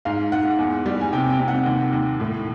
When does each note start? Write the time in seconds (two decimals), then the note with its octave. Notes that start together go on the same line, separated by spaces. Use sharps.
0.05 G#2 F5
0.32 G#2 F#5
0.59 E2
0.86 G3
1.01 G#5
1.13 C3 G5
1.30 G5
1.40 C3
1.48 F#5
1.66 D#2
1.93 D#2
2.20 A2